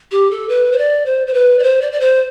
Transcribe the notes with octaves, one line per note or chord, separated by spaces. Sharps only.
G4
A4
B4
C5
D5
C5
C5
B4
D5
C5
D5
D5
C5